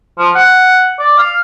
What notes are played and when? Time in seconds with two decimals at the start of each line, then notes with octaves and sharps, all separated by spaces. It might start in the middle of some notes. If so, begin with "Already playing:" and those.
0.18 F3
0.35 F#5
0.99 D5
1.18 F5